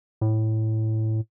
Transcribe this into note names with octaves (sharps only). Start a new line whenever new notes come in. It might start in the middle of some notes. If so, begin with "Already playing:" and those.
A2